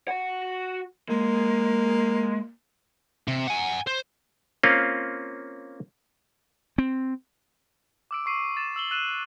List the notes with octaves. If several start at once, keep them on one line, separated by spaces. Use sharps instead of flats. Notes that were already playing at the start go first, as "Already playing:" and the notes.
F#4 F#5
G#3 A#3
C3
F#5 G#5
C5
A#3 C4 C#4 F4
C4
D6 E6 D7
C#6 C7 D#7
A6 E7
E6 F#7 G7
E6 F#6 A6 D#7 E7 F#7